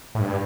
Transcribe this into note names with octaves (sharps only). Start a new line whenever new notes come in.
A2
G2